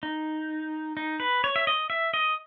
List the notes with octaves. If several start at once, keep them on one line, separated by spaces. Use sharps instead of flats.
D#4
D#4
B4
C#5
E5
D#5
E5
D#5